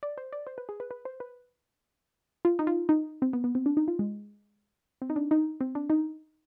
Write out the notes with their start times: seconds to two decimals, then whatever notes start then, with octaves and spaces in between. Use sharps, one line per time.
0.03 D5
0.17 C5
0.33 D5
0.47 C5
0.58 B4
0.69 G#4
0.80 B4
0.91 B4
1.05 C5
1.20 B4
2.45 F4
2.59 D#4
2.67 F4
2.89 D#4
3.22 C4
3.33 B3
3.44 B3
3.55 C4
3.66 D4
3.77 D#4
3.88 F4
3.99 G#3
5.02 C4
5.10 D#4
5.16 D4
5.31 D#4
5.61 C4
5.75 D4
5.90 D#4